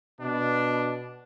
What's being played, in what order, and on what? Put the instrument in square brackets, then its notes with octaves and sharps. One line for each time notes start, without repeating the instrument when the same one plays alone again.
[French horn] B2 [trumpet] D4